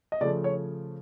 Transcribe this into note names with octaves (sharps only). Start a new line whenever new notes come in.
D#5
C#3 F3 A3 D5
C#5